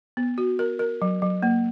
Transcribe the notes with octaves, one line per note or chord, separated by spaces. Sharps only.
B3
F#4
A#4
A#4
F#3
F#3
A#3